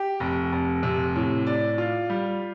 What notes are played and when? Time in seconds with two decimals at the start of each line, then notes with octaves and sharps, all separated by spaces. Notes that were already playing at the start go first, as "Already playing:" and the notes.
Already playing: G4
0.20 F1
0.52 F1
0.83 C3
1.16 A2
1.47 D5
1.78 F4
2.10 G3